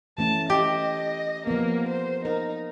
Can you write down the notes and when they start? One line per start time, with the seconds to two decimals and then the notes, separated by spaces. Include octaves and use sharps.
0.18 E3 A3 C#4 A5
0.50 G4 D#5
1.47 F3 A#3 B3
1.89 C5
2.25 D#4 A#4